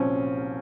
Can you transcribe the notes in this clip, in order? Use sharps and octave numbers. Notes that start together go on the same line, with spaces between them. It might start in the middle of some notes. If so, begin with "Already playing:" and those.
Already playing: C2 A#2 F3 C4 C#4